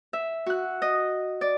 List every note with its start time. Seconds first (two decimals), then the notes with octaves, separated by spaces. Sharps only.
0.13 E5
0.46 F#4 F#6
0.82 D#5
1.41 D5